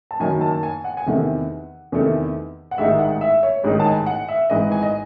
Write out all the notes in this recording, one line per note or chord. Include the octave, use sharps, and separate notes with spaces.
A5
F#1 F#2 D#3 G#5
A5
G#5
F#5
G#5
E2 C3 D#3 A3 F#5
E2 C3 D#3 A3
F#5
A1 G#2 D#3 G#3 D#4 E5
F#5
E5
C#5
A1 G#2 D#3 G#3 D#4 C#5
A5
G#5
F#5
E5
G#1 G#2 E3 D#5
G#5
D#5